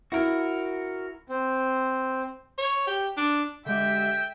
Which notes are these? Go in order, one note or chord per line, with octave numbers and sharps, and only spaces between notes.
E4 F#4 A#4
C4
C#5
G4
D4
D3 G#3 G4 E5 G5